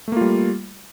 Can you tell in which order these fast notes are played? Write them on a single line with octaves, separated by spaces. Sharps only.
A3 A#3 F4 G3